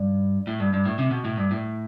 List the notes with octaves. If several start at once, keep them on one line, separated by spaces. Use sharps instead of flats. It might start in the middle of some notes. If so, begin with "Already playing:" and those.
Already playing: G2
A2
G2
G2
A2
C3
B2
A2
G2
A2